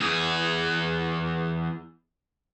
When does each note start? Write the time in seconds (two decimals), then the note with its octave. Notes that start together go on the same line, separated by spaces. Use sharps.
0.01 E2 G#4